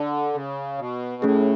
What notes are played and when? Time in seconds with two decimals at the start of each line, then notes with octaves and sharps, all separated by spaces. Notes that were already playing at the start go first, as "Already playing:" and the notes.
Already playing: D3
0.34 C#3
0.78 B2
1.22 A2 A3 C#4 G#4